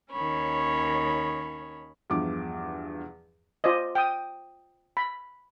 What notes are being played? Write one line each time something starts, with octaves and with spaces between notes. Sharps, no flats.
D#2 D#3 C#4 C#5 B5
E2 G2 F3 D6
F4 C5 D5 D#5
G5 D#6
B5